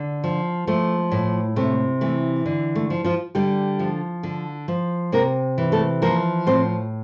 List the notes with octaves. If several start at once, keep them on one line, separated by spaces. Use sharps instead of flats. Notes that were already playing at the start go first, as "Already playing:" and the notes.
Already playing: D3
F3
F3 A3
A2
C3 A3
E3 A3
D3
A3
F3
F3 F4
D3 G3 G4
F3
D3
F3
C3 A#3 A#4
E3
A3 A4
F3 A#3 A#4
A2 C4 C5